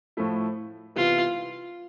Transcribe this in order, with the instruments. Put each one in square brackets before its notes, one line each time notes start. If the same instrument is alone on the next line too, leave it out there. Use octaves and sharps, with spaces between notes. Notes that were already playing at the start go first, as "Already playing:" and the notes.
[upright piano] A2 F3 A3 E4
[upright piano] C3 E3 G3 B3 E4 [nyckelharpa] F4